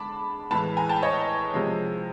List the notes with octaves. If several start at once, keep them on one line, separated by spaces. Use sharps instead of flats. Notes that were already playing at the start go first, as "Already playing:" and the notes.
Already playing: D3 G#3 A5 B5 D6
A2 E3 G#3 A5 B5
G#5 A#5
G5 A5
C#5 D#5
C3 F3 G#3